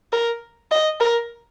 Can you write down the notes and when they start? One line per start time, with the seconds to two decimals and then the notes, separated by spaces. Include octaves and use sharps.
0.13 A#4
0.71 D#5
1.01 A#4